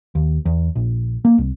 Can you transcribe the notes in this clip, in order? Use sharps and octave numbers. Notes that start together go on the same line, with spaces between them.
D#2
E2
A#1
A#3
C2